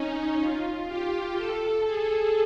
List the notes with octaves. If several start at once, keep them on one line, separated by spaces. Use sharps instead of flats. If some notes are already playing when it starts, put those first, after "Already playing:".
Already playing: C#4 D#4
F4
G4
A4
G#4